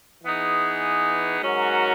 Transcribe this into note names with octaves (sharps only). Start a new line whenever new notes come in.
E3 B3 D#4 G#4
G#2 F#3 C#4 F#4 A#4